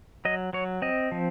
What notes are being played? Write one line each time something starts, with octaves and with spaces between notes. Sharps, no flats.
F#3 D#5
F#3 C#5
C4 D#5
F3